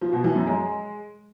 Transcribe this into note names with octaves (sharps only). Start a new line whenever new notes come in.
F3
B2
E3
F#2
G#3